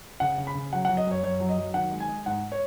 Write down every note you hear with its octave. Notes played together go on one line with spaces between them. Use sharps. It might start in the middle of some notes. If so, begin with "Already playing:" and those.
C#3 F#5
C#3
B5
C#3
F#3 F#5
F#5
F#3
D#5
F#2 C#5
F#2 C#5
F#3
D#5
F#3
D#3 F#5
G#3
G#5
G#3
G#2 F#5
C#5